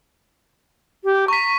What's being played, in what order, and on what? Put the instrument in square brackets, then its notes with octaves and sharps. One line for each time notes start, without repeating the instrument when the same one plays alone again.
[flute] G4
[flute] A#5 [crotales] C#6 B6